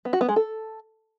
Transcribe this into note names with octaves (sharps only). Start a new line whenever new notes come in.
B3
F#4
B3
G#3
A4